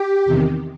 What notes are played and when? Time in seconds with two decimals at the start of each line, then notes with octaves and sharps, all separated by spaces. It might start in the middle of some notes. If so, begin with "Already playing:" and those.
Already playing: G4
0.26 E2 C3 D#3